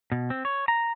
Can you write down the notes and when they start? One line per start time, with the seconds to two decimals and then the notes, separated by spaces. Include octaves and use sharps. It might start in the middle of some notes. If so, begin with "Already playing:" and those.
0.12 B2
0.30 C4
0.45 C#5
0.68 A#5